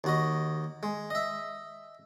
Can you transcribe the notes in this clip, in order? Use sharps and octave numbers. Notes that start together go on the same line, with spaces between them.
D#2 F#4 D#5
G#3
D#5 E5